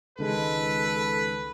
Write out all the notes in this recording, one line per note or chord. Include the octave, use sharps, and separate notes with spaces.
C#2 D#3 G#3 A4 B4